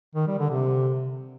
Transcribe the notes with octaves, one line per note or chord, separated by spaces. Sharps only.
D#3
G3
D3
C3